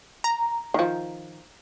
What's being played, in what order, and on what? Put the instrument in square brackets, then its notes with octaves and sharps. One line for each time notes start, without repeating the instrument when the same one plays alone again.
[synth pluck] A#5
[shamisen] D#3 F3